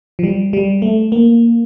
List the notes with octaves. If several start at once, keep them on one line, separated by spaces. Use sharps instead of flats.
F3
G3
G3
A3
A#3